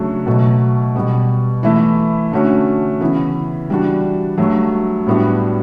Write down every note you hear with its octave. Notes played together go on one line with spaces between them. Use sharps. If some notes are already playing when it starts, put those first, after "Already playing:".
Already playing: C#3 F#3 A3 D4 F#4
B2 F#3 A3
B2 G3 B3
E3 A3 E4
D3 A3 C#4 F#4
C#3 E3 B3 E4
E3 G3 D4 F#4
G2 F#3 A3
A2 G3 B3 D4 F#4